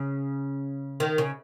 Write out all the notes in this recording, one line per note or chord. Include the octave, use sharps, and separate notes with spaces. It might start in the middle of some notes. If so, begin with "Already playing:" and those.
Already playing: C#3
D#3
C#3